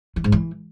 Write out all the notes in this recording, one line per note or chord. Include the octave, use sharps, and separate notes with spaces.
E3
G#2
E3